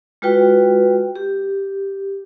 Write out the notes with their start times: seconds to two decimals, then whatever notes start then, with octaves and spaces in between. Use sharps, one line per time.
0.22 G#3 F4 F#4 B4 G5
1.16 G4